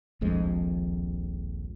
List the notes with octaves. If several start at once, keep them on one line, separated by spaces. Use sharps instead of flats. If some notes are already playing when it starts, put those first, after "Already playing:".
D#1 A#1 F2 G#3